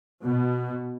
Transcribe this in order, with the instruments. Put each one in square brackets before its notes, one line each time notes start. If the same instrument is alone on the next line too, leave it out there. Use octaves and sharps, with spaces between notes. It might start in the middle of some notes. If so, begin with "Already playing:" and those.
[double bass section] B2